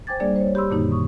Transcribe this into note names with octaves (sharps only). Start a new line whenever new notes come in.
C5 G5 G#5 D6 G#6 A6
G3 A#3 D4 G#4 D5
C5 C#5
G4 B5 C6 E6
F#2 A#2 D3 D#3 A#3 D#4
C#6 D#6